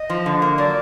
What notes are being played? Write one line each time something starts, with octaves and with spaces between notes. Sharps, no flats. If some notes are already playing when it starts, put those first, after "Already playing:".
Already playing: D#5
F3
D3
A#3
F#3 D5